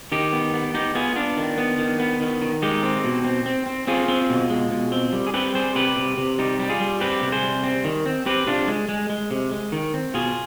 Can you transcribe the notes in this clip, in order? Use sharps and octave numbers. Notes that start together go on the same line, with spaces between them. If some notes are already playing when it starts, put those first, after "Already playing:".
D#3 D#4 G4
B3
B3
B3 D#4 G4
B3 F4 G#4
B3 D4 F4
D#3
B3
D#3
B3
D#3
D#3
G#3 D#4 G4
C4
B2
C4
C4
C4
C4 F4 G#4
C4
B2
G#3
B2
C4
G3
G#4
C4 G4 B4
G3 G#4 C5
C3 G4 B4
C3
C3
G3 D#4 G4
G3
F4 G#4
G3
C4 G4 B4
C3
G#4 C5
G3
C4
D#3
C4
C4 G4 B4
C3 D4 F4
G#3
G#3
G#3
C3
G#3
D#3
C4
B2 F4 G#4